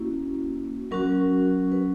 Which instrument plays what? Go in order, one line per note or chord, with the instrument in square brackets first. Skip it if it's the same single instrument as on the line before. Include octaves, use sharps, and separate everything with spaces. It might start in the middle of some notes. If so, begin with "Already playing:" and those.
Already playing: [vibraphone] A#3 C#4 E4 F#4
F#3 C#4 F#4 A#4
B4